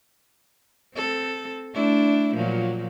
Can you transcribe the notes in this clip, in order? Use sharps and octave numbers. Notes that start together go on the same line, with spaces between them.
C4 A4
A3 D4 E4
A#2 F3 F#3